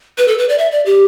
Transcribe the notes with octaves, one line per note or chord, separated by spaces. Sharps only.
B4
A4
B4
D5
E5
D5
G4